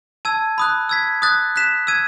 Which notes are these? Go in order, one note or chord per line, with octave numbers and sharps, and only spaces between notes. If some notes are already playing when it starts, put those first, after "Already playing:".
A5 E6 G#6 D#7
B5 D#6 F#6
E6 G#6 B6
D#6 F#6 A6
F#6 B6 E7
E6 G#6 D#7